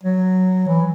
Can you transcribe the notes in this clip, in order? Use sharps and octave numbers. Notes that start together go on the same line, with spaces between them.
F#3
E3